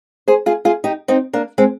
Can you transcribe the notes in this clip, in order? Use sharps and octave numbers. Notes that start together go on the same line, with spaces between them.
G#4 C5
F4 G#4
F4 G#4
D#4 G4
C4 D#4
A#3 D4
G#3 C4